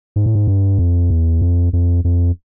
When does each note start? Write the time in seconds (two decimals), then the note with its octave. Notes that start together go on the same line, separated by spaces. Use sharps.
0.16 G#2
0.26 A2
0.35 G#2
0.47 G2
0.79 F2
1.10 E2
1.42 F2
1.73 F2
2.04 F2